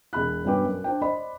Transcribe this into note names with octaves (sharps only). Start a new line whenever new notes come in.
E1 G#4 B5 F#6
G2 B2 C#4 B4 G5 D6
F#2
D4 C5 G5
C5 D5 D#5 B5